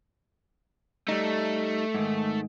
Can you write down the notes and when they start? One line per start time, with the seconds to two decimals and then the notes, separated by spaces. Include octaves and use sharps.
1.09 G3 A3 D#4
1.95 G#2 D#3